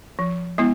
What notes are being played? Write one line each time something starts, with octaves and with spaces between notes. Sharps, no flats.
F3
G#3 B3 E4